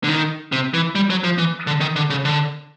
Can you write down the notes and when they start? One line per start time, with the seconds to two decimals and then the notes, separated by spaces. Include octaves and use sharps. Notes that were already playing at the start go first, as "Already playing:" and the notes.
0.04 D3
0.09 D#3
0.52 C3
0.74 E3
0.95 G3
1.10 F#3
1.24 F3
1.38 E3
1.67 D3
1.81 D#3
1.96 D3
2.10 C#3
2.25 D3